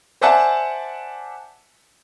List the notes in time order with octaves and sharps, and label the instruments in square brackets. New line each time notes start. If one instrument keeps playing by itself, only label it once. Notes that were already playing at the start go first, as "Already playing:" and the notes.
[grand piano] C5 D5 E5 F#5 G#5 A5